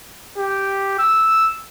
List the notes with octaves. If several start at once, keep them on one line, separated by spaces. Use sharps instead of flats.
G4
E6